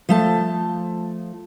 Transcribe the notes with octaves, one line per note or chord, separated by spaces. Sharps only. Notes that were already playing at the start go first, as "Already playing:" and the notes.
F3 A3 A5